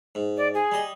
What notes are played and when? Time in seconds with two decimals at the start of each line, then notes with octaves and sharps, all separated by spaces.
0.15 G#2
0.37 D5
0.54 G#4
0.72 G3 D#5